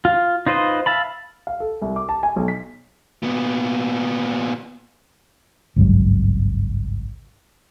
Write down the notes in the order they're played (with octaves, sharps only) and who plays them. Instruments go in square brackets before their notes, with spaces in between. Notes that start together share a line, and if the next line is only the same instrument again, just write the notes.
[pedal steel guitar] F4
D#4 F4 B4 C5 D#5
E5 F5 A5 B5
[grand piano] F5
A4
C2
D6
A5
G#5
B1
B6
[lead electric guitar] A#2 B3
[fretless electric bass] G#1 C#2 G2 F#3